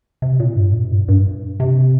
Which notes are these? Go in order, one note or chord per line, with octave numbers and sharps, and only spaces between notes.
C3
A#2
G2
A#2
G2
G2
C3